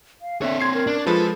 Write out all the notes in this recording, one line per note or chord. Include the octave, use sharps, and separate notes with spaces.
F5
D3 C4 C#5 E5
C6 G#6 C7
A#4
D4
F3 G#3 F4 A4 B4